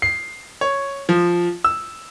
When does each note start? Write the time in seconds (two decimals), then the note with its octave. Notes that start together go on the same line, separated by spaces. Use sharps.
0.02 C7
0.61 C#5
1.09 F3
1.64 E6